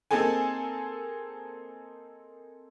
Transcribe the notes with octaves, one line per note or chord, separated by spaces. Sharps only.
A#3 C4 D#4 G#4 A4 G#5